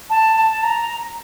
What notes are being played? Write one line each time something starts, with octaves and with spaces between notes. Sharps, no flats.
A5
A5
A#5